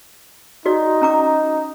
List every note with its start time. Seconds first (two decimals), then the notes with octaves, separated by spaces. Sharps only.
0.66 D#4 F#4 D5
1.02 C#4 A#5 D6